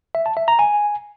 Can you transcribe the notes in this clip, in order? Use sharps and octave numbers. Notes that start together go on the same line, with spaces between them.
E5
A5
E5
A#5
G#5